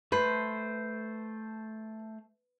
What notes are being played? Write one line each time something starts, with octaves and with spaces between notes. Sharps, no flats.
A3 B4 C5